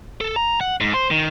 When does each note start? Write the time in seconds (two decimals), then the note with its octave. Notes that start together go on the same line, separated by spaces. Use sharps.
0.21 A4
0.36 A#5
0.61 F#5
0.81 G#2
0.94 C5
1.11 D#3